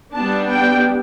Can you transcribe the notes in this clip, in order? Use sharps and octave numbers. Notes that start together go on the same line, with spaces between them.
G3 B3 D4 A5
G5